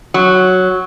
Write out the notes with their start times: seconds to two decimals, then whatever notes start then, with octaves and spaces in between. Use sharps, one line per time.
0.14 F#3